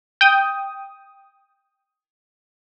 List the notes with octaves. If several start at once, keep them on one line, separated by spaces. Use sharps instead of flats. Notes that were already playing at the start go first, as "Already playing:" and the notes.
G5 D#6